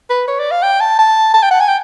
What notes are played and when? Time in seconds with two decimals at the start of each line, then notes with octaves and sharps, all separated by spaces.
0.10 B4
0.28 C#5
0.39 D5
0.51 F5
0.63 G5
0.80 A5
0.99 A5
1.34 A5
1.43 G5
1.51 F#5
1.60 G#5
1.68 G5